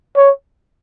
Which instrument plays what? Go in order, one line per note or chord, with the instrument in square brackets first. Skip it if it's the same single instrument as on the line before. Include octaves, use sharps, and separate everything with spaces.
[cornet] C#5